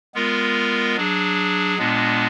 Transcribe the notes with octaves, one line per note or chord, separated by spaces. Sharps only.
G#3 B3 F4 A#4
F#3 D4 G#4
A#2 G#3 B3 D4